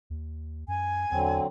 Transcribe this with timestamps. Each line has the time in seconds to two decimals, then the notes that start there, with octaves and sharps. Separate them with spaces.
0.10 D#2
0.68 F#2 G#5
1.12 E2 D3 F#3 C4